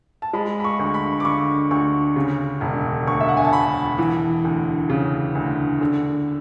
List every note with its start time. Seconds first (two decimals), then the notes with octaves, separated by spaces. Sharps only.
0.22 A5
0.33 G#3 B5
0.60 B5
0.64 C#6
0.79 D2
0.94 B5
1.20 D6
1.25 D3 C#6
1.71 D2 C#6
2.16 C#3
2.61 E1
3.07 D2 C#6
3.20 E5
3.28 F#5
3.37 G#5
3.45 A5
3.53 E1 B5
3.98 E3
4.44 D2
4.90 C#3
5.35 D2
5.81 D3